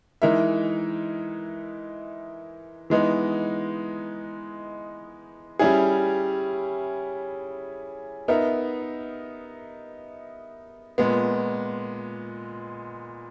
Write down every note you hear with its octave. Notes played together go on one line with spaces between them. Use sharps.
E3 G#3 D#4 A#4 E5
E3 G#3 B3 D#4
G3 C#4 E4 G#4
B3 D#4 A#4 E5
A#2 G#3 B3